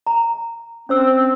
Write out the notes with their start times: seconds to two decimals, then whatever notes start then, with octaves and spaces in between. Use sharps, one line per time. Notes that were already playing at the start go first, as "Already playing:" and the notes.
0.07 A#5
0.89 C4 C#4 C5 E6